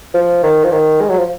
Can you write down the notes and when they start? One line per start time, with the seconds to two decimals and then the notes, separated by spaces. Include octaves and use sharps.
0.14 F3
0.43 D#3
0.64 F3
0.72 D#3
1.01 G#3
1.10 F#3
1.18 F3